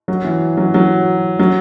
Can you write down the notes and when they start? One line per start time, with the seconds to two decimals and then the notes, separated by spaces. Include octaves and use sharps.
0.08 F#3
0.25 E3
0.57 F#3
0.74 F#3
1.39 F#3